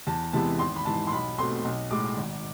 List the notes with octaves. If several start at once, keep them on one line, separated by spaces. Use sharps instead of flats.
E2 A5
C3 E3 G#3 B3 A5
G#1 C6
B5
G#2 E3 A5
C6
B1 B5
B2 A3 C4 C6
B1
A2 G#3 D6
G#1